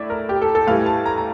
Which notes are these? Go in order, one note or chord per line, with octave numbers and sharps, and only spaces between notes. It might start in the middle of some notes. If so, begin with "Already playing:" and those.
Already playing: A2 A3 D4 D5 E5
A#4
G4
A4
A4
A2 E3 G3 F5
A5
A#5
A#5